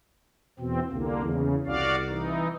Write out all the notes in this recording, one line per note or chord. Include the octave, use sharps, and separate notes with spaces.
E2 B2 C4
C2 D3 A#3
E2 C#3
C2 F#4 D5 F5
E3 D#4